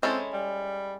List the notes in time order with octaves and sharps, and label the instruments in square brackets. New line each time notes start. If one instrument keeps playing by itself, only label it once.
[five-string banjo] G#3 C#4 E4 A4 [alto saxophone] C4
[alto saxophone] G3